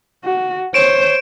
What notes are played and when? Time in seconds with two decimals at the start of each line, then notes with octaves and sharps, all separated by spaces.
0.24 F#4
0.74 C5 C#5 D7 E7